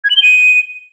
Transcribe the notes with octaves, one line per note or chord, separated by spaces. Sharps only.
G#6
F#7
G7
D#7